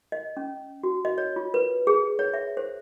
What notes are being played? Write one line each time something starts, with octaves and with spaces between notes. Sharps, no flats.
D#5
C#4
F#4
D#5
C#5
F4
B4
G#4
C#5
E5
C5